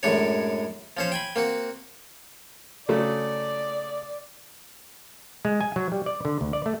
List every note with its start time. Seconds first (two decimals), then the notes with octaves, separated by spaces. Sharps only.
0.03 F#2 A2 G#3 D4 C#5
0.97 F3 C#4 C5
1.12 G5 G#5 B5
1.36 A#3 C4 F#4
2.89 C#3 F#3 A3 D5
5.45 G#3
5.61 G#5
5.76 F#3
5.92 G3
6.06 D5
6.25 D3
6.41 D2
6.53 D5
6.66 A3